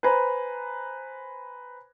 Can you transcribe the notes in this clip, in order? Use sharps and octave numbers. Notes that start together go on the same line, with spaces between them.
B4 C5 G#5 A#5 B5